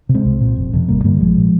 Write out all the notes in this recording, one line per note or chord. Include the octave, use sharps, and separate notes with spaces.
C3
G#3 C4
C2
A#2
F1
F2 C3
G#1 G3 A#3
G2 D3 G3 A#3
A#1 F3 G#3
A#2